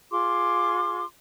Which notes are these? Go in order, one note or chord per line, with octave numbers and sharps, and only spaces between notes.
F4 G#4 C6 D6